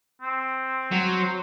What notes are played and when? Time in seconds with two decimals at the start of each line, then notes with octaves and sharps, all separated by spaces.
0.22 C4
0.91 F#3
1.17 C5